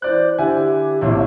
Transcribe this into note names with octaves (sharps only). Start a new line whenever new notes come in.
E3 C5 D5 F#6
D3 E4 G4 G#5
D1 A#1 E4 C#5